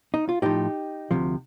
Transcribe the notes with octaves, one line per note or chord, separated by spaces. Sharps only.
D#4
F4
A2 F3 D#4 G4
D2 C3 F3